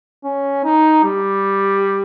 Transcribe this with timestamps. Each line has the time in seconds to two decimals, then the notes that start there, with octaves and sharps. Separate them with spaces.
0.24 C#4
0.65 D#4
1.04 G3